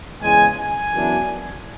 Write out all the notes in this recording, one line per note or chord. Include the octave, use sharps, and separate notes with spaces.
E2 C#3 G#3 G#5
G#5
F#2 E3 B3 D4